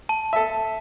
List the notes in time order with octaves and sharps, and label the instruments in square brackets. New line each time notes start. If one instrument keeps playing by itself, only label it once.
[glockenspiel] A5
[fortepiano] A4 E5